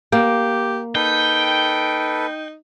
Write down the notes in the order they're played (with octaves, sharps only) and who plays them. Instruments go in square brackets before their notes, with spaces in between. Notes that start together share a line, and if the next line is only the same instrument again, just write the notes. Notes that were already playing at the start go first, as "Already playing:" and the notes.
[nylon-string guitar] A#3 [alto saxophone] G4
[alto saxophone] D#4 [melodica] A4 B4 [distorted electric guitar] G5